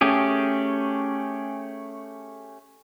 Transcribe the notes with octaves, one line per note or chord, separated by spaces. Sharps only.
A3 C#4 G4 G#4